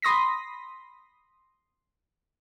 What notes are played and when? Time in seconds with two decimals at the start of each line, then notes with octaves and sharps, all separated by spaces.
0.02 B5 C6 D#6 A#6 B6